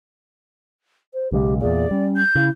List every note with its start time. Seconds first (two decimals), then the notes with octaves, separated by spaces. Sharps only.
1.14 C5
1.32 B1 C#3 G#3 G4
1.61 E2 A#2 G#4 D5
1.91 G3 C#4
2.17 G6
2.35 C#3 E4